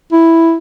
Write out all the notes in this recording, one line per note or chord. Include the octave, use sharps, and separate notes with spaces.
E4